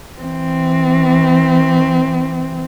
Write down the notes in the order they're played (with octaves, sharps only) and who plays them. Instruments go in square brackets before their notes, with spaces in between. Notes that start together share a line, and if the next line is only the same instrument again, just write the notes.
[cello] E3 C4